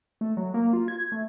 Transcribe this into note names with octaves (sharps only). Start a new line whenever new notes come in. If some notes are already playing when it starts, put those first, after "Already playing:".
A3
F#3
A#3
F4
G#6
A3